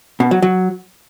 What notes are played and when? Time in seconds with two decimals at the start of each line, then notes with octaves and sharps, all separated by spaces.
0.20 B2
0.31 F#3
0.42 F#3